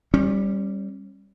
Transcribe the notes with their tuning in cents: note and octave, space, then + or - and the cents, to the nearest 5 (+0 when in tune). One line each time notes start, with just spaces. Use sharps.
G3 +5 C#4 -35